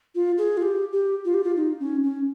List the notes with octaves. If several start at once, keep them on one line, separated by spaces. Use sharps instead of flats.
F4
G#4
F4
G4
G4
F4
G4
F4
D#4
C#4
C#4